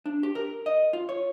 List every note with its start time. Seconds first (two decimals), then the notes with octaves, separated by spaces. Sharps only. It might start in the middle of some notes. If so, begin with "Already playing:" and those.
0.06 D4
0.23 G4
0.35 A#4
0.66 D#5
0.93 F4
1.09 C#5